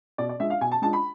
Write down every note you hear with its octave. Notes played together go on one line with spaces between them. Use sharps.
B2 D5
D5
G#3 D4 F4 E5
F5
B2 G#5
A5
G#3 D4 F4 A5
B5